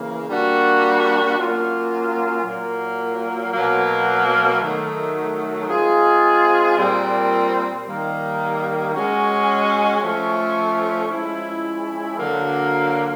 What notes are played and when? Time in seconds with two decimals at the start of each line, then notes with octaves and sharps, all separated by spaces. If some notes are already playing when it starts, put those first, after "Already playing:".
Already playing: C#3 E3 A#3
0.28 G3 A#3 D4 F#4
1.37 F#3 A#3 C#4 F4
2.45 A#2 F#3 A#3
3.53 B2 F#3 A#3
4.62 D#3 F#3 A3
5.69 G#3 C4 F4 G#4
6.78 A#2 G3 C4
7.86 D#3 G3 A#3
8.94 G#3 C#4 F#4
10.03 F3 A3 C#4
11.11 F3 G#3 C#4 E4
12.19 D3 F#3 A#3